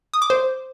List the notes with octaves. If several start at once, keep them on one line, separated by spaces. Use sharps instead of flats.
D#6
D6
C5